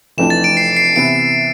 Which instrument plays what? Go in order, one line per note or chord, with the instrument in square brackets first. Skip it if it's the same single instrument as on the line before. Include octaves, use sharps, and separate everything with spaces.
[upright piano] F1 F2 E3 A3 D4 [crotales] E7
[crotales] A6
D7
C7
C7
[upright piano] C3 E3 B3 E4 [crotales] D7